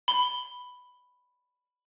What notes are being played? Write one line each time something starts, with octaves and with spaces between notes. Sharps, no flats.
B5 G7